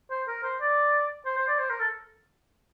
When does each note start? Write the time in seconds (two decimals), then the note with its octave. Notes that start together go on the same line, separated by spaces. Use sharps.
0.10 C5
0.28 A#4
0.43 C5
0.61 D5
1.26 C5
1.37 C5
1.47 D5
1.58 C5
1.69 A#4
1.80 A4